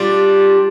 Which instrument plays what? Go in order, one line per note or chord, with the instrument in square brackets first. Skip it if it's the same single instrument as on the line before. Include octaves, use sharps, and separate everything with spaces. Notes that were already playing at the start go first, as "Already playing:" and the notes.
Already playing: [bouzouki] G3 D4 F4